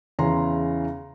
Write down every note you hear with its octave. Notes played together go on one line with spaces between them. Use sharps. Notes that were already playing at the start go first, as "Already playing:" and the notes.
E2 C#3 E3 A#5 C6